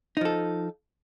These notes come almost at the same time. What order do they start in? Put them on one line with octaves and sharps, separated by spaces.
D#4 F3 A4